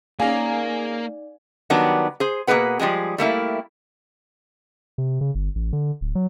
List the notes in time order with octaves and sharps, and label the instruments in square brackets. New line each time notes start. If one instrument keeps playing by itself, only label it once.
[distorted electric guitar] A#3 [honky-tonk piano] C#4 G#4 [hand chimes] D#4 D5 [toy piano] F5 G#5
[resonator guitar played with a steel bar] D#3 F#3 G3 B3 D4
G#4 C5
B2 A#3 D#4 G#4 B4 F#5
F3 G3 G#3 G#4
G3 A3 A#3 E4
[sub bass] C3
C#3
G1
A1
D3
D1
F#3